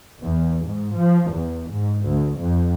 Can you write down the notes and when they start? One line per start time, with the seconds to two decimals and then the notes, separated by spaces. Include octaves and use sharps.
0.19 E2
0.66 G#2
0.96 F3
1.31 E2
1.71 G#2
2.04 D2
2.38 F2